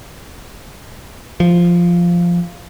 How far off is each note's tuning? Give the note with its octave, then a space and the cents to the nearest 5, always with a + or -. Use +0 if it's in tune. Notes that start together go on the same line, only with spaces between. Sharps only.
F3 -5